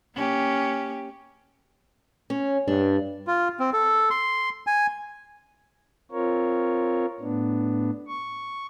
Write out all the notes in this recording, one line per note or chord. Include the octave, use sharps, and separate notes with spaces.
A#3 C#4 G4
C#4
G2 D4
F4
C4
A4
C6
G#5
C4 F4 A#4 C#5
A2 B3 D4
C#6